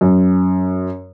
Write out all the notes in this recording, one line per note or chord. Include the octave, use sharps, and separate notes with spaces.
F#2